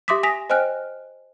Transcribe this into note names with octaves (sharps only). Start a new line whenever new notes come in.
G4 E5 C6 D6 D#6 B6
G#5 D#6 A#6 B6 F7
C5 D#5 G5 G#5 F6 F#6